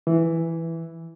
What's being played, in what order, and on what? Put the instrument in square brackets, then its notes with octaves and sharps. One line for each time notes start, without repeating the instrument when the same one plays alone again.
[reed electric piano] E3